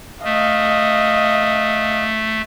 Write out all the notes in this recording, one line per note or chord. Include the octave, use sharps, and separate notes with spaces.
A3 D#5 F5